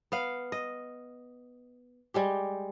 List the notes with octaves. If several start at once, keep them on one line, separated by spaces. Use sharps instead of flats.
B3 F5
D#5
G3 G#3 G4